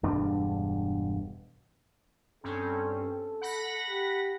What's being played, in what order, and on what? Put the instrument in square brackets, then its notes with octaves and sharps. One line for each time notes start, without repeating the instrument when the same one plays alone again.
[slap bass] E1 G2 D4
[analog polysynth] G2 C4 C#4 [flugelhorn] A4
[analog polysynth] F#5 B5 A#6
[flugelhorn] G4